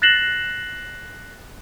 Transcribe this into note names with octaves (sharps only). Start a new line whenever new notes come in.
F#6 A6 A#6 C7 E7 F#7